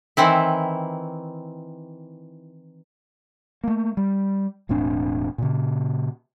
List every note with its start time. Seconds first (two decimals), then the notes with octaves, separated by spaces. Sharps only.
0.17 D#3 E3 C4 E4
3.64 A3 A#3
3.97 G3
4.69 E1 A2 C4 D4
5.38 A#2 C#3